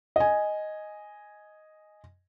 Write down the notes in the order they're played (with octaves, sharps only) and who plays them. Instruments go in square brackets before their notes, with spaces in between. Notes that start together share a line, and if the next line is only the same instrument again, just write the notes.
[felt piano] D#5 G#5